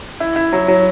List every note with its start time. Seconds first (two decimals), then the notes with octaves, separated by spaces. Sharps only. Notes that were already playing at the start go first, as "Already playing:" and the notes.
0.20 E4
0.36 E4
0.53 F#3
0.68 F#3